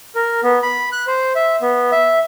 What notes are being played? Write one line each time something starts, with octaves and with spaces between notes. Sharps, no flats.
A#4
B3
B5
F#6
C5
E5
B3
E5